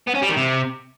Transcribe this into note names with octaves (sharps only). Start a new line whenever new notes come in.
B3
C#4
G3
D#3
C3